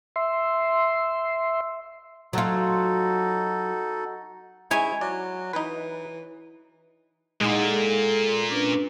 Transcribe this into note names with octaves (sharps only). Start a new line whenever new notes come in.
E5 C6
F#3 D#4 F4 F#4 A4
G#3 D#4 E4 C#5 G#5
F#3 D5
E3 D#4 B4
A#2 G#3 D#4 E4 F#5
A4
A4
C#4 D4 B4